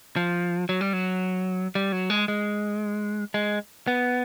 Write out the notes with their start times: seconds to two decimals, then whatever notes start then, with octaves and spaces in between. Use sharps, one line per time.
0.16 F3
0.69 F#3
0.81 G3
0.93 F#3
1.75 G3
1.92 F#3
2.10 G#3
2.28 G#3
3.34 G#3
3.87 B3